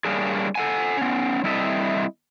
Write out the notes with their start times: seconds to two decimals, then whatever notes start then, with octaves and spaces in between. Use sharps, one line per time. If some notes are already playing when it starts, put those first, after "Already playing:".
0.05 G3 A#3 C#4 D4 G#4
0.55 A4 F#5 G#5
0.97 B3 C#4
1.44 G3 C4 E4 A4 D#5 E5